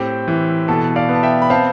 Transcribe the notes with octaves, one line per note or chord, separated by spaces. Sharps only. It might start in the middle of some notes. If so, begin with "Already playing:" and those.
Already playing: A2 C4 G4
E3
B2 A4
D5 F5
B3
A5
E5 G5
B5
C4 F5 A5